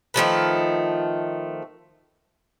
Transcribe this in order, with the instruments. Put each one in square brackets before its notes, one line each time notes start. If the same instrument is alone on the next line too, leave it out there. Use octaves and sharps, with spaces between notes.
[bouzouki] D#3 F3 A3 B4